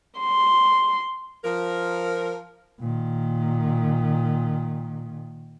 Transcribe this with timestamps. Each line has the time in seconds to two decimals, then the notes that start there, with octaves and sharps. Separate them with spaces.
0.19 C6
1.44 F3 A#4
2.80 A#2 D#3